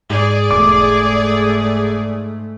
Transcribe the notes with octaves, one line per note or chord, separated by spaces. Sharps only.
G#2 G#4 D5
E1 G#2 A3 D6